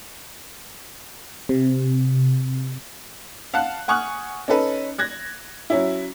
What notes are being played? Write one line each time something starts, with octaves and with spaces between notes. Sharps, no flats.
C3
F5 F#5 A5 F#6
F#5 G#5 C#6 D#6 F6 F#6
C#4 D#4 A4 B4
F#6 G#6 A#6
F#3 C#4 E4